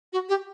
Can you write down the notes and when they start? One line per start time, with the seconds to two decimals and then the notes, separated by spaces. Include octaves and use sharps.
0.13 F#4
0.29 G4